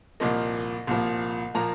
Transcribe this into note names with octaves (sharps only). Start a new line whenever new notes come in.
C2 A#2 F3 A#3 D#5
C2 A#2 F3 A#3
A#2 F3 A#3 A#5